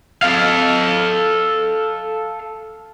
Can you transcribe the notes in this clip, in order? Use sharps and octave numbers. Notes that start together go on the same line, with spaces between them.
A4 F5